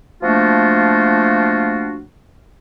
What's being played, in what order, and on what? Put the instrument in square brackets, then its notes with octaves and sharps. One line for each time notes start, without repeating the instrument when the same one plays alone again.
[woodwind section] F3 A3 A#3 D4 F4 F#4